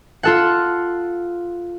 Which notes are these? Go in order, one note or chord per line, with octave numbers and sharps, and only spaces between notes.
F4 A4 F#5